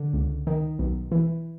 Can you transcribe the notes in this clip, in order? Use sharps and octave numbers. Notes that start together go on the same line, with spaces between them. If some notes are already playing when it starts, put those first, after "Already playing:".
Already playing: D3
C#2
D#3
B1
E3